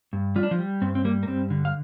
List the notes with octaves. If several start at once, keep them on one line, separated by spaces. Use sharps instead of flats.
G2
G3 F4
D4
F3 F4
G3
G2 C4
C4
G3 A#3
A#3
G2 C4
D3
F5